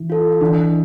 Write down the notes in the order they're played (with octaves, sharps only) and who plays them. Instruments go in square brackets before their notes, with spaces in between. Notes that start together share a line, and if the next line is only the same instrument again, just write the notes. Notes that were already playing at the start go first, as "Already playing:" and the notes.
Already playing: [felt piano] E3
[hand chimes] F4 A4
[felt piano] E3 [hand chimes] D4